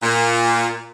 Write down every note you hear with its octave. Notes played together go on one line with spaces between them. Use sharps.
A#2